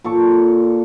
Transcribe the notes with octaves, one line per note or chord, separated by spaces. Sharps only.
A#2 A4 C#6 D6